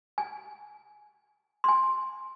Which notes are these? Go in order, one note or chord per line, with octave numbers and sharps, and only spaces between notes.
G#5
G#5 C6